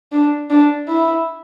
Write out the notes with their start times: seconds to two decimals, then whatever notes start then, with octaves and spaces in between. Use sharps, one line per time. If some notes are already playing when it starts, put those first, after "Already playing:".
0.12 D4
0.50 D4
0.88 E4